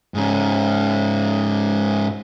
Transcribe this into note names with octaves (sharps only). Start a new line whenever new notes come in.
G#2 C#4